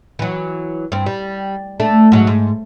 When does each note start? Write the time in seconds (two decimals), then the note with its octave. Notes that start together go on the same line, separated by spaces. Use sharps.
0.19 E3 F#3
0.92 G2 C4
1.06 G3
1.80 A3 D4
2.12 G#2 F#3
2.27 G#2